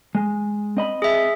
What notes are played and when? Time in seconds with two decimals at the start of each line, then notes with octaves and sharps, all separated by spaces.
0.15 G#3
0.77 C4 D#5 B5
1.02 G#4 E5